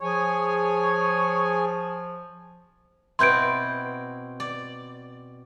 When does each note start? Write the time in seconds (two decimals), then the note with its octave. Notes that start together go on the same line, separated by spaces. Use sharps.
0.01 F3 G#4 C#5 G#5
3.19 B2 C4 E4 C6 G6 D7
4.40 D5